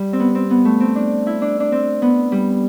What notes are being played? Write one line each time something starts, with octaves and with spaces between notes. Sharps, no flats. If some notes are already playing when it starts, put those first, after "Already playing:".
Already playing: G3
C4
B3
C4
B3
A3
C4
D4
E4
D4
D4
C4
B3
G3